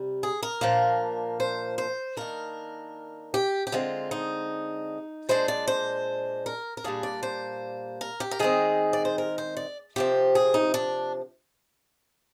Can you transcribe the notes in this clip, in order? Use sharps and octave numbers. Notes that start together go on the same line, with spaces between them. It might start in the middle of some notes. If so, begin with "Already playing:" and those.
Already playing: C3 G3
G#4
A#4
A#2 F3 A#3 D4
C5
C5
D#3 A#3 D4 A#4
G4
G4
D3 G#3 C4 F4
D#4
A#2 G#3 D4 C5
D5
C5
A#4
A#4
A#2 G3 A#3 D4 G#4
D5
C5
A#4
G4
A#4
D#3 G#3 C4 G#4
D5
C5
A#4
C5
D5
C3 F3 C4 G4
G#4
D#4
D4